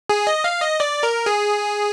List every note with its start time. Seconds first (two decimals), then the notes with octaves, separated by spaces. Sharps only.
0.10 G#4
0.27 D#5
0.44 F5
0.62 D#5
0.80 D5
1.03 A#4
1.26 G#4